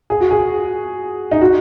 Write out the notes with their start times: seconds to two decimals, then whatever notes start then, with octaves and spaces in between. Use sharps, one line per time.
0.10 G#4
0.20 F#4
0.31 G#4
1.31 D#4
1.41 F#4